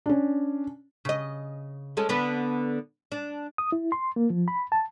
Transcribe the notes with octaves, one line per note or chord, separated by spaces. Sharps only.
C#4 D4
C#3 D#5
G#3 C#4 A4
D3 B3 B4
D4
D#6
E4
C6
A#3
F3
B5
A5